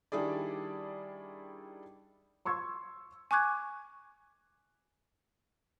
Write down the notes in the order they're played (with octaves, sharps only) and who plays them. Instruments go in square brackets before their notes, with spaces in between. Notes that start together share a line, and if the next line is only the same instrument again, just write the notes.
[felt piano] D#3 G3 D4 E4 G#4 D5
[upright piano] C6 C#6 E6 G#6
[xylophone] G#5 C#6 D6 F#6 G#6